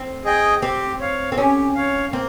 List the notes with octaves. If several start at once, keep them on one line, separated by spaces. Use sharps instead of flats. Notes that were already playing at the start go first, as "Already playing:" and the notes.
Already playing: C4
G#4 D#5 G5
C4 G4
C#5 F5
C4
C#4 G4
C#5 F5
A#3 C4